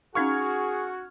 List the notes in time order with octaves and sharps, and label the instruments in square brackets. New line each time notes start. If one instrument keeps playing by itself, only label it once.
[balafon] C#4 D#4 F5 [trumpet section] F#4 [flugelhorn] G#4 [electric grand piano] C#6 F6 G#6